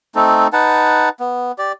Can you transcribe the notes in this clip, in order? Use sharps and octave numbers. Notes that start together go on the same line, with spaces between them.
A3 C4 D#4 A4
D#4 B4 F#5 A5
B3
G4 D5